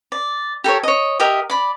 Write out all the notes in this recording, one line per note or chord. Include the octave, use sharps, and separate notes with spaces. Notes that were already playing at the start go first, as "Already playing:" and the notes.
D5
G4 A4 A#4 C#5
C#5 D#5
G4 A#4 D#5 E5
D5 B5